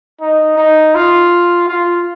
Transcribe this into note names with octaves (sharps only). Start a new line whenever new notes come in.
D#4
D#4
F4
F4